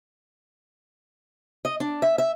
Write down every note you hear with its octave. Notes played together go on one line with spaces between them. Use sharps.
D#5
D4
E5
E5